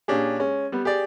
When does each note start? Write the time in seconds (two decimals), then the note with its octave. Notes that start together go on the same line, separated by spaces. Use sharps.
0.08 A#2 C#4 D4 G4 G#4
0.39 G#3 C#4
0.72 G3 B3
0.85 G4 G#4 D5